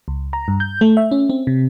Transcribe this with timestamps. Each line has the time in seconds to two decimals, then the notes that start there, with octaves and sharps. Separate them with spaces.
0.08 C#2
0.33 A#5
0.48 G2
0.60 G6
0.81 A3
0.97 E5
1.12 C#4
1.30 C4
1.47 C3